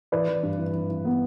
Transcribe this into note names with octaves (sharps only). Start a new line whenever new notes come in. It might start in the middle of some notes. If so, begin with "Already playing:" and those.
E3 B4 D5
E3
G2
E3
E3
E3
B3